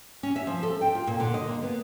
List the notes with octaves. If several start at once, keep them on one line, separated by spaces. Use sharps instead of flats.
C#4
E5
F3
A4
G5
F4
A#2
D3
D#5
A#3
B3